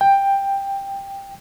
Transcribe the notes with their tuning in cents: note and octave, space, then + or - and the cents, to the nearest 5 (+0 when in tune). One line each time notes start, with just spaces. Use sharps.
G5 +10